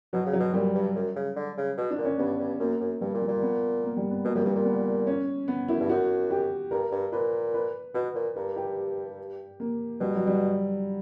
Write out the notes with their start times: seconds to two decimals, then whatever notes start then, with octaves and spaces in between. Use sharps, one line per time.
0.13 B2 F#3
0.26 C#3
0.33 F#3
0.40 B2
0.54 A#2 G3
0.75 G2
0.95 F#2
1.16 C#3
1.36 D3
1.57 C#3
1.78 B2
1.91 D4
1.98 A#2
2.05 C#4
2.18 G2 B3
2.39 G2
2.60 F#2 A#3
2.80 F#2
3.01 G2 G3
3.14 A#2
3.22 G3
3.28 A#2
3.42 B3
3.84 A#3
3.97 G3
4.11 B3
4.24 B2 A#3
4.35 F#2 G3
4.45 G2 G3
4.55 A#2 A#3
4.65 B3
5.07 C#4
5.48 B3
5.68 F#2 E4
5.80 G2
5.89 F#2 F#4
6.31 G4
6.71 G2 A#4
6.92 G2
7.12 A#2 B4
7.54 B4
7.95 B2 B4
8.15 A#2
8.36 G2 A#4
8.56 G4
9.60 A#3
10.01 B2 G3
10.15 F#3
10.27 G3